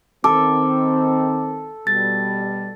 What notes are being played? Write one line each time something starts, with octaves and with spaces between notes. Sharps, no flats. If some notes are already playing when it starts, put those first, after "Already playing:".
D#3 C4 A4 D6
B2 G3 A6